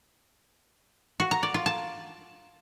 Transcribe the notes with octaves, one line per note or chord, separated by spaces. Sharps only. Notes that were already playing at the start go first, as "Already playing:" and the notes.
F#4
A#5
D5
F4
A5